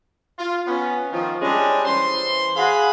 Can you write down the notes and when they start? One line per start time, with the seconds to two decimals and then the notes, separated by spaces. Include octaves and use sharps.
0.39 F4
0.68 B3 C#4
1.11 D#3 F3
1.42 G3 G#3 C#4 D4
1.85 E3 C5 C6
2.56 G#4 F5 F#5 B5